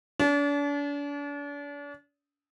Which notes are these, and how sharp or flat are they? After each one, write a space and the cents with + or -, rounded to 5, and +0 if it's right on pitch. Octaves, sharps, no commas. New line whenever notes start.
D4 -40